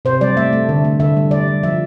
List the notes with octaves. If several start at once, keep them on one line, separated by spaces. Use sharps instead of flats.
C3 C5
G3 D5
A3 E5
A3
D3
A3
D3 E5
G3
G3 D5
G3
F3 E5